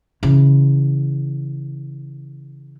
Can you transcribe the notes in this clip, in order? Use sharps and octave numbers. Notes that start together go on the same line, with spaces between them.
C#3 E3